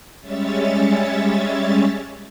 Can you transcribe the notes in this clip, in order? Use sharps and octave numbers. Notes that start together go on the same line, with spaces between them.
G3 G#3 C#4 C#5 E5 A6